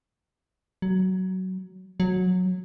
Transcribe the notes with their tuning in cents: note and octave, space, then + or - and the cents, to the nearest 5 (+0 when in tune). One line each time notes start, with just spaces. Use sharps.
F#3 +15
F#3 -15